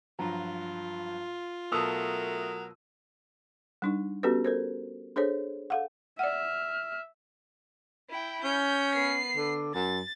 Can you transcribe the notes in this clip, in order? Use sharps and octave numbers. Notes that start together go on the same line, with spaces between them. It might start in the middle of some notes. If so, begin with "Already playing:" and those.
G2 F3 F#3 F4 A#5
B2 F#3 A3 A#4 A5 D#6 E6 F7
G3 D4 D#4
B3 C#4 F#4 G4 A4 B4
A4 A#4 C5
D4 G#4 A4 C5 C#5
A4 F5 F#5
D5 E5 F#5 F6
E4 G5
C#4 G6
B3 C7
D3
F#2 A6